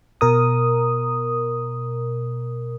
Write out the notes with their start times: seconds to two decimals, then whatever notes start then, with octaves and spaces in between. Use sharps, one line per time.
0.21 B2 A#4 D#6